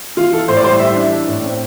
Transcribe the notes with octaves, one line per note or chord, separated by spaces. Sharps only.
E3 F4
E3 A4
A2 C5
D5
G3 C5
E3 E5
D4
D4
A2
C4